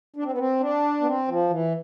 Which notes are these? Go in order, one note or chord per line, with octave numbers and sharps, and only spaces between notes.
D4
C4
B3
C4
D4
B3
C4
F3
E3